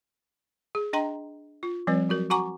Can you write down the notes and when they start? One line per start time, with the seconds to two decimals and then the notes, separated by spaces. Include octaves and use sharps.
0.75 G#4
0.93 D4 D#5 G5 A#5 C6
1.63 F4
1.87 F3 G3 C4 B4 C#5
2.09 F#3 F#4 A#4
2.30 F#4 F#5 G#5 A#5 C#6 D6